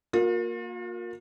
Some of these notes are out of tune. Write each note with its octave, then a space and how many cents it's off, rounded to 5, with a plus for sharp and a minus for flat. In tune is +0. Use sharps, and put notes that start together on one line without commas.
A#3 +0 F4 +45